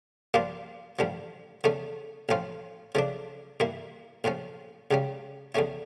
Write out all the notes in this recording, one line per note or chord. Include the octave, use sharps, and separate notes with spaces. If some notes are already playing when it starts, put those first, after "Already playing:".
G2 F3 A#3 D4 F4
A1 G2 D3 F3
E2 D3 A3 C#4
A1 A2 F3 C#4 F4
C#3 F3 A3 D4
G2 E3 A#3 E4
A#1 A2 F3 C#4
C#2 C#3 G3 C#4
E2 D3 A3 C#4 E4